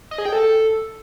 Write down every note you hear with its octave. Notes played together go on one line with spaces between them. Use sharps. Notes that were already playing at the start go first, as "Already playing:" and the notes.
D#5
G#4
G5
A4